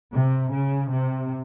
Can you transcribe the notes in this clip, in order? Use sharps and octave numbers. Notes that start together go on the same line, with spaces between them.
C3
C#3
C3